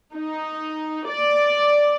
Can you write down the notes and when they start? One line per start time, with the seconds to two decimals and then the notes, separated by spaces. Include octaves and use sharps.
0.14 D#4
1.09 D5